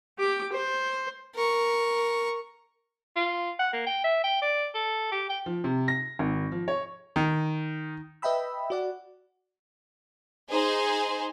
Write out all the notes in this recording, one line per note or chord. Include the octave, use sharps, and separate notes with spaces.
G4 D6
C5
A#4 C#6
F4
F#5
A#3
G5
E5
G5
D5
A4
G4
G5
F3
C3
A#6
G#1
F3
C#5
D#3
B4 D#5 E5 G5 B5 E6
F#4 D5 F#5
D#4 G#4 C5